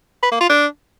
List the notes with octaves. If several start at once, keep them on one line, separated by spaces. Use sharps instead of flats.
B4
A#3
F4
D4